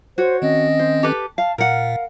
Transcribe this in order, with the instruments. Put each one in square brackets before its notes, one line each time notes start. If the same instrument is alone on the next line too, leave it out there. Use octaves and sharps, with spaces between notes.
[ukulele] F#4 C#5 [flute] C5
[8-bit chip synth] D#3 C4 C#4 [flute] D#5
[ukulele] C5
G4 A4 B4
[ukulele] F5 [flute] A5
[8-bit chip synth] A#2 [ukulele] A#4 F#5 [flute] F5